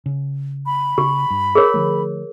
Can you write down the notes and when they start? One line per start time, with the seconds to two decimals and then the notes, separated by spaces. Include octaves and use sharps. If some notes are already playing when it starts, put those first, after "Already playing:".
0.06 C#3
0.66 B5
0.98 C#3 G4
1.30 G2
1.55 G#4 A#4 C#5
1.74 D3 F3 A3